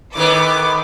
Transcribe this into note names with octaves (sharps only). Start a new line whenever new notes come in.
A2 D#3 B3 D6